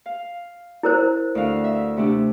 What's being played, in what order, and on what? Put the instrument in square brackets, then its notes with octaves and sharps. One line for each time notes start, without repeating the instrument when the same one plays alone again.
[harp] F5
[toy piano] E4 A#4 C5
[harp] D2 F5
E5
C3 A3 D4